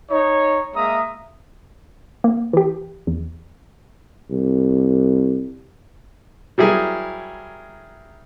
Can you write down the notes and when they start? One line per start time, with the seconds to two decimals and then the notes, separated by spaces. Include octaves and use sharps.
0.10 D#4 C#5
0.74 G#3 A#3 E5 A#5 D#6
2.24 A#3
2.53 E3 G4
3.07 E2
4.31 C2
6.58 F#3 G3 E4 G#4 A#4